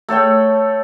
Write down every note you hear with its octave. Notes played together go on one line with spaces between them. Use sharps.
A3 A4 C#5 G5